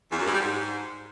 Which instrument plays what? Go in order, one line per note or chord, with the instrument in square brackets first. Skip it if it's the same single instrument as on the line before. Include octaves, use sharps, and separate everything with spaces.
[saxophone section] E2
F#2
G2
G3
G#2